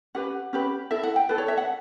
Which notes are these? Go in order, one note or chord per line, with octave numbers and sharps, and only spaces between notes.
C#4 G4 B4 F#5
C#4 G4 B4
E4 A4 E5
F#5
G5
E4 A4 B4
C#5
E5
F#5